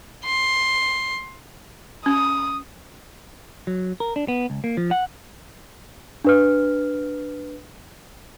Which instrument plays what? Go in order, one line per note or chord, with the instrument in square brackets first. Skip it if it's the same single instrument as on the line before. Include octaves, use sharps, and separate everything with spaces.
[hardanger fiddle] C6
[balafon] C#4 [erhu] D#6
[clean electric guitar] F#3
A#4
D4
B3
C#2
A#3
F3
F#5
[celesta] D4 B4 F6